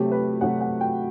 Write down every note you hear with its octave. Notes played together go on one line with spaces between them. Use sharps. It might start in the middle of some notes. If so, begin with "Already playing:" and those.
Already playing: C3 F#3 A3 G4
B4
C3 F#3 A3 F#5
F#5
G5